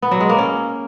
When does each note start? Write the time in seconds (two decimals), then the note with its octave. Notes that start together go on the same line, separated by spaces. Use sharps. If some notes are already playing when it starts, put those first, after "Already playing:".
0.02 B3
0.11 F#3
0.20 G#3
0.29 A#3
0.38 C#4